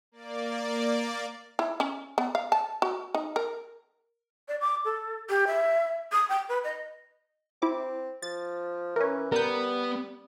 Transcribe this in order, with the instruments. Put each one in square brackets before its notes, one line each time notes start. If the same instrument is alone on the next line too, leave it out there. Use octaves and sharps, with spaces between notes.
[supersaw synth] A#3 D5
[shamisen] E4
C#4
B3
F5
A5
F#4
D#4
A#4
[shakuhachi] D5
D6
A4
G4
E5
D#6
G5
B4
D#5
[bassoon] C4 [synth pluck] E4 D6
[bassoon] F3 [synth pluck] A6
[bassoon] E3 [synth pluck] C#4 A#4
[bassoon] G3 [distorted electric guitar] B3 [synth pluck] A#4 G6